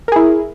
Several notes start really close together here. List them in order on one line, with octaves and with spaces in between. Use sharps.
A#4 G#4 E4